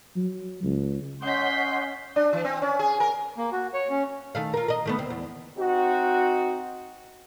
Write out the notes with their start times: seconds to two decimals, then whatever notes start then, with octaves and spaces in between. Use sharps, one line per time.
0.16 F#3
0.63 C#2
1.22 C#4 C#5 D#5 F#5 C6 G6 B6
2.16 D4
2.33 E3
2.45 C4
2.62 C#4
2.79 G#4
3.00 A#4
3.38 A#3
3.52 F#4
3.74 C#5
3.90 C#4
4.35 D#3 A3 F5
4.54 F4 A#4
4.68 A#4 D#5
4.85 D#3 A3 B3
4.99 D2 C4
5.10 E2
5.58 C4 D#4 F#4